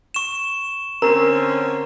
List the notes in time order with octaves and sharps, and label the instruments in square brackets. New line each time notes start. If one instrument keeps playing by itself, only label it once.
[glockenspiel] C#6 E7
[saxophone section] D3 C4 C#4 [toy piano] A#4 [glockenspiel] A#5